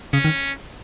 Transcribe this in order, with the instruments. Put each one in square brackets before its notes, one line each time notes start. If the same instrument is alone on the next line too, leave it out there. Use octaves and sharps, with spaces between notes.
[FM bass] C#3 [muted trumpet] C#4
[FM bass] D#3